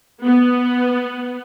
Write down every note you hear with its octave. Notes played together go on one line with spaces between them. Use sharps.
B3